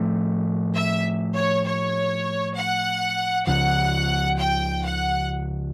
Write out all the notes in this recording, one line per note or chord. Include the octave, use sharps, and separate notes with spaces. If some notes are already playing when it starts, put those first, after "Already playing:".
Already playing: A2 F3 A3
E5
C#5
C#5
F#5
C#2 C#3 F3 F#5
G5
F#5